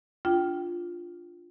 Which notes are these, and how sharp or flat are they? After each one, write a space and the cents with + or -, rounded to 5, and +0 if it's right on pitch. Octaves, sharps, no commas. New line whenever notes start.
D4 +0 F4 +0 G5 -15